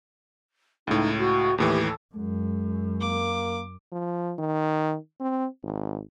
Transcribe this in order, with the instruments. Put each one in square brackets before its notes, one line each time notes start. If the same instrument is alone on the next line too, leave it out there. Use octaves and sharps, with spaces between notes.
[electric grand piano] C#2 A2 [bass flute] D#4
[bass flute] F#4
[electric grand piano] D#2 A2 E3 [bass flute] G4
[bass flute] A4
[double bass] F#2 [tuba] G#3
[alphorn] A#3 [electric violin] D6
[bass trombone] F3
D#3
C4
G#1